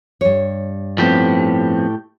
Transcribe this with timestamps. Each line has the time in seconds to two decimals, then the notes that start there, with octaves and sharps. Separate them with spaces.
0.21 G2 C#5
0.98 A2 F3 B3 C4 G4